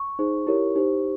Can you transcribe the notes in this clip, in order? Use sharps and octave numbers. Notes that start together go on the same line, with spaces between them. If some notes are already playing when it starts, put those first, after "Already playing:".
Already playing: C#6
D#4 G#4 C5
E4 G4 A#4 C#5
D#4 G4 C5